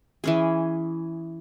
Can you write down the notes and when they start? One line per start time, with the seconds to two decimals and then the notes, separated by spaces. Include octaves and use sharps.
0.24 E3 C#4 G#4